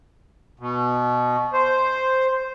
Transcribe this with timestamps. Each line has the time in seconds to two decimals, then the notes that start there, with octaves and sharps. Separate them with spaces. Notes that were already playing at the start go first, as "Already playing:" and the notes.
0.60 B2
1.53 C5